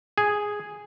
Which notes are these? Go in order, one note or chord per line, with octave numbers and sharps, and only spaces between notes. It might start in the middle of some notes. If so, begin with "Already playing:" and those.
G#4